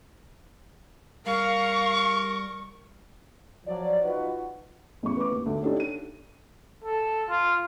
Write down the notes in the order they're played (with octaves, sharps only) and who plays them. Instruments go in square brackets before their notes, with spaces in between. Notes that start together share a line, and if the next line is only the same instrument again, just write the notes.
[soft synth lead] G3 [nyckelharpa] A#4 [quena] F5 [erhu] C#6
[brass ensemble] F3 F#3 D5
D#4 F4 F#4 B4
[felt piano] A1 E2 C#6
B4 D6
D#2
D2
D4 D#4 G4 A4 C#5
D#7
[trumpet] A4
F4